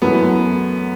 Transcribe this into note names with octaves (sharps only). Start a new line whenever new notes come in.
F#2 E3 A3 B3